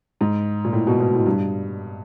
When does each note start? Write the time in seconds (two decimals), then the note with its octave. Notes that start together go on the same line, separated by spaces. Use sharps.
0.21 G#2
0.65 A#2
0.73 A2
0.87 B2
1.00 B2
1.13 A2
1.26 G2